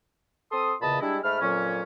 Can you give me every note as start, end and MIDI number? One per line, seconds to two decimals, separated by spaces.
0.52 0.73 60
0.52 0.73 69
0.52 0.73 84
0.52 0.73 87
0.81 0.99 40
0.81 0.99 46
0.81 0.99 49
0.81 0.99 75
0.81 0.99 81
0.81 0.99 83
1.01 1.17 55
1.01 1.17 56
1.01 1.17 62
1.01 1.17 64
1.22 1.40 44
1.22 1.40 57
1.22 1.40 83
1.22 1.40 89
1.41 1.83 41
1.41 1.83 46
1.41 1.83 54
1.41 1.83 61